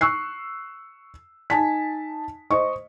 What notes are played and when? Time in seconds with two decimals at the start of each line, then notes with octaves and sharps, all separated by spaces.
0.01 C#6 E6 F#6 C7
1.50 D#4 G#5 A5 B6
2.51 C5 D#5 C#6